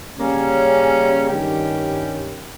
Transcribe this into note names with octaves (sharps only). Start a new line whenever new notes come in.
C#3 G3 A#3 C#4
G2 D#3 G3 C#4 G4